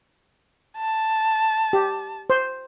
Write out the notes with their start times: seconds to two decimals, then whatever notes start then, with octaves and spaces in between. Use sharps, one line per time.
0.77 A5
1.73 G4
2.30 C5